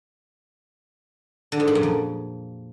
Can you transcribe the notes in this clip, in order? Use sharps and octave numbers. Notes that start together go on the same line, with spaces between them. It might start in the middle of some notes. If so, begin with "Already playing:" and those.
D3
G#2
A#2
F#2
F2